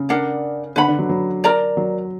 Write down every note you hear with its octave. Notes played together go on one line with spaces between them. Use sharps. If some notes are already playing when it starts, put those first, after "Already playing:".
Already playing: C#3
D4 A#4 D5 F#5
D3 B4 F#5 B5
D3
F#3
F#3
A#4 D5 A#5
F#3